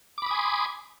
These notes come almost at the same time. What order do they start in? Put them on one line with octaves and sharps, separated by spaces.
D6 B5 D#6 G#5 C6